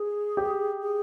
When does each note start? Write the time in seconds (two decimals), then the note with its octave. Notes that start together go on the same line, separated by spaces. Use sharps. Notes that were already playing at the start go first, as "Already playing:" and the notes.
Already playing: G#4
0.37 G4
0.81 G#4